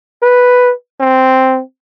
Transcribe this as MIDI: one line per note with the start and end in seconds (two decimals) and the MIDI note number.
0.23 0.72 71
1.00 1.61 60